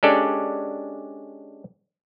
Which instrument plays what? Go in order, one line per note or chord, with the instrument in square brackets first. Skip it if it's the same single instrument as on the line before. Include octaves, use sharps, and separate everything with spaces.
[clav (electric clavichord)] G#3 C#4 D4 G4 A4 D5